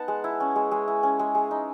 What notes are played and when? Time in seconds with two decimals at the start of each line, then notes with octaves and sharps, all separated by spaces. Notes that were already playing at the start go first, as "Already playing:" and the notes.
Already playing: B3 D#4 F#5 A5
0.08 G#3
0.24 E4
0.40 C#4
0.56 G#3
0.72 G#3
0.88 E4
1.03 C#4
1.19 G#3
1.35 G#3
1.51 D#4